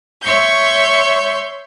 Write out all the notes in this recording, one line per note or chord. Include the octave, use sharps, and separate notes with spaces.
C#5 E5 C6 C#6 G6